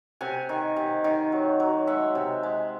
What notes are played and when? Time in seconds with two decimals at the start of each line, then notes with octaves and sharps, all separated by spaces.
0.21 C3 F#5 G#5
0.49 D#3
0.76 C3
1.04 D#3
1.32 F#3
1.60 F#3
1.87 G#3 E5 F#5
2.15 C3
2.43 G#3